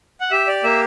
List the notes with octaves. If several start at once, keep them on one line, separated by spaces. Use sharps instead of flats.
F#5
G4 E5
D5
A#3 E5